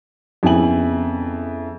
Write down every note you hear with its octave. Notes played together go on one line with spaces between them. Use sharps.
F2 C#3 B3 E4 G#5 F#7